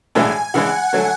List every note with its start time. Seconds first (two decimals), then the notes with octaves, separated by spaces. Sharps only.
0.15 B1 A2 E3 G#3 D4 G#5
0.54 C#3 E3 G#3 D4 F#5
0.93 D3 F#3 A3